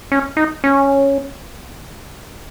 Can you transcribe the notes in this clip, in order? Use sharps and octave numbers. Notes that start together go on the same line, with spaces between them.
C#4
D#4
C#4